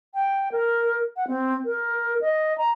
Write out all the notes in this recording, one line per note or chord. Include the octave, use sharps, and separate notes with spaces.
G5
A#4
F#5
C4
A#4
D#5
A#5